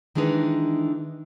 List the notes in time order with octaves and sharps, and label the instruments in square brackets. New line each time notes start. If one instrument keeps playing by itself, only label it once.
[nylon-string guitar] D#3 E3 G#3 D4 D#4 B4